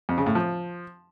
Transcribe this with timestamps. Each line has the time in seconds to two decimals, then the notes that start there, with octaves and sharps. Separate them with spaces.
0.09 F2
0.18 C#3
0.26 A2
0.35 F3